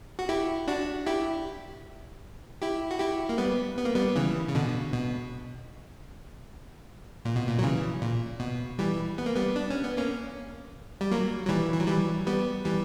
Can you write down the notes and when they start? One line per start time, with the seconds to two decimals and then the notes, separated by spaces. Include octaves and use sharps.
0.19 F#4
0.29 E4 G4
0.68 D4 F#4
1.06 E4 G4
2.62 E4 G4
2.91 F#4
2.99 E4 G4
3.29 A#3
3.38 G3 B3
3.77 B3
3.85 A#3
3.95 G3 B3
4.16 C#3 E3
4.49 C#3
4.55 B2 D3
4.93 B2
7.25 A#2
7.36 B2
7.47 A#2
7.59 F#3
7.63 C#3 E3
8.02 A#2
8.40 B2
8.79 E3 G3
9.18 B3
9.26 A#3
9.36 G3 B3
9.56 D4
9.70 C#4
9.84 B3
9.97 A#3 C#4
11.01 G3
11.11 F#3 A#3
11.45 F#3
11.49 E3 G3
11.72 E3
11.80 F#3
11.88 E3 G3
12.27 G3 B3
12.65 E3 G3